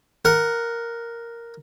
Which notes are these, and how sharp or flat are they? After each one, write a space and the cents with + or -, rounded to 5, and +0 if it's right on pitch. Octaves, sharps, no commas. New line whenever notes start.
A#4 +0 F#5 +0